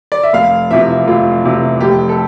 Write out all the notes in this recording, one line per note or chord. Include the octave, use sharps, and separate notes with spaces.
D5
E5
F1 F5
E2 C3 F3 E5
F1 F4
E2 C3 F3
F1 G4
A4